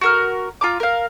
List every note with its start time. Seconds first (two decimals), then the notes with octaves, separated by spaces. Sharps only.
0.01 F#4 A#4 F6
0.61 F4 A#5 D6
0.80 A#4 F5